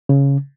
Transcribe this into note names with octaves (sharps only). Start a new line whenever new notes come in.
C#3